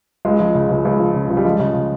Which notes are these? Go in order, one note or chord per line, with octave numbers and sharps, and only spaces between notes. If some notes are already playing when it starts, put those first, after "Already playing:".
C#2 G#3
F3
C#3
C#2
C#2
F3
C#3
C#2
G3
F3 G#3
C#3